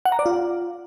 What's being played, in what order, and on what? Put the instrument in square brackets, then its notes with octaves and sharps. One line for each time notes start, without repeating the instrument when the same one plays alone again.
[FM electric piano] F#5
A#5
D5
F4